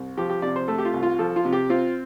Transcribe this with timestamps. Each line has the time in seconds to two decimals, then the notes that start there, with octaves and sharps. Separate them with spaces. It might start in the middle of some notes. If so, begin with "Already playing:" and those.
Already playing: C2
0.17 F3 G4
0.29 G4
0.42 C3 D5
0.56 C5
0.68 A3 A4
0.78 G4
0.85 F4
0.94 C2
1.03 F4
1.19 F3 A4
1.36 F4
1.45 C3
1.53 G4
1.70 C4 F4